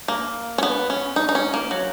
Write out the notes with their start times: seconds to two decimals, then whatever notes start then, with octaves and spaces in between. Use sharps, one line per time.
0.08 A#3
0.58 C#4
0.63 B3
0.90 C#4
1.16 D#4
1.29 D#4
1.35 C#4
1.54 A#3
1.71 F#3